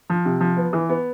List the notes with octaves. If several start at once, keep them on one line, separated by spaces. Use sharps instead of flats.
F3
C3
F3
B3
E3
B3